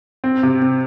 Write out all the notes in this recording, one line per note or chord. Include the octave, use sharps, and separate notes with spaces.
C4
C3
C4